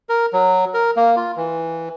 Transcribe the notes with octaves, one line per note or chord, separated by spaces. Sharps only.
A#4
F#3
A#4
A#3
F4
E3